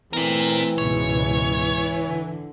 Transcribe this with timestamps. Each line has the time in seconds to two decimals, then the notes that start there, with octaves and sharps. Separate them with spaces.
0.13 E3 A3 C4 A#4 D5
0.78 C#2 G#2 B2 C#5
2.06 D3